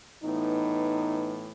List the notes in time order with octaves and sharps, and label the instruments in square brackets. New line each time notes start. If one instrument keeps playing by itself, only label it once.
[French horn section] A2 E3 B3 D#4